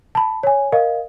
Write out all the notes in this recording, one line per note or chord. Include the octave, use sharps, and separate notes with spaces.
A5 B5
C#5 G#5
A#4 D#5 F5